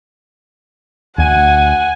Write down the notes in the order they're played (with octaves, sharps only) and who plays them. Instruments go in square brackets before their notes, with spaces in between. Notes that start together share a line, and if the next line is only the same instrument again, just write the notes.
[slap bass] D2 [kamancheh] F#5 [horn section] G#5